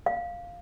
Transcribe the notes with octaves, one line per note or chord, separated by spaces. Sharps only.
F5